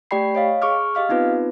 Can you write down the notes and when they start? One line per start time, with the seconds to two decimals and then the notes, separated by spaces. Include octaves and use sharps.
0.11 A3 G4 D5 G5 B5 C7
0.35 C#5 D#5 F5
0.62 G#4 C#6 D6 F6
0.95 G4 D#5 F5 F6
1.09 B3 C4 D#4 F4 B4